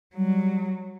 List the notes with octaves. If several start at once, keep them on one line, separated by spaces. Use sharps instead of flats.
F#3 G3